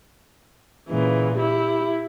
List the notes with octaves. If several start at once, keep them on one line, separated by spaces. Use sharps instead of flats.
A#2 C#3 E3
E4 G4